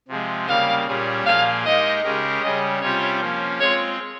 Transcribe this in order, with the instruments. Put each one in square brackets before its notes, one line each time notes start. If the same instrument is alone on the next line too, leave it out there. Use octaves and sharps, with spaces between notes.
[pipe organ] C3 F3 G#3
[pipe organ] C#3 G3 A#3 [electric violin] F5
[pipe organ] A#2 G3 C#4 G#4
[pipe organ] A#2 F3 A#3 F4 G#4 [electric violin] F5
[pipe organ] G#3 D#4 G4 A#4 [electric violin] D#5
[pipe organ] C#3 G#3 C#4 G4 A#4
[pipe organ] C#3 G3 C#4 [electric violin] D#5
[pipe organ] C3 G3 C#4 F4 C5 [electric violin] C#5
[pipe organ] F3 A#3 C#4
[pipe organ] G#3 C4 F4 [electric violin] C#5